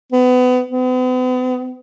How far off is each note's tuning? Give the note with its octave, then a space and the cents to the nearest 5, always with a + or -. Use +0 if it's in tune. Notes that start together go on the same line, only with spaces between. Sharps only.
B3 +30
B3 +45